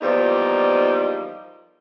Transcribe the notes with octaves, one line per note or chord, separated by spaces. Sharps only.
E2 A#2 F3 G3 D#4